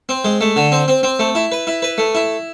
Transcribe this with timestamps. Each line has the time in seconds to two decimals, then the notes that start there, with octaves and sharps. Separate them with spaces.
0.09 C4
0.25 G#3
0.41 A3
0.56 D3
0.72 C4
0.88 C4
1.03 C4
1.19 A3
1.35 E4
1.52 B4
1.67 E4
1.82 B4
1.98 A3
2.15 E4